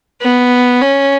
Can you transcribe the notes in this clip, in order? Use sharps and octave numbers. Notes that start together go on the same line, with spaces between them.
B3
C#4